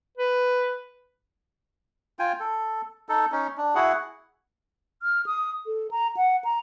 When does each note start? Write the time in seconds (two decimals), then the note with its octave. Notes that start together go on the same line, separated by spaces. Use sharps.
0.18 B4
2.19 F4 G5 G#5
2.40 A4
3.09 D#4 A4
3.32 C#4 D#4
3.58 D4
3.75 E4 F#4 G#4 F#5
5.03 F6
5.26 D#6
5.66 A4
5.91 A#5
6.17 F#5
6.45 A#5